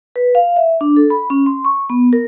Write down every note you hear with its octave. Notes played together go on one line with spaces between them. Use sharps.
B4
F5
E5
D4
A4
B5
C#4
C6
C#6
B3
A#4